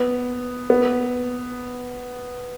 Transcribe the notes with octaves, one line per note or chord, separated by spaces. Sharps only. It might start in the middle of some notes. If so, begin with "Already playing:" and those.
Already playing: B3
B3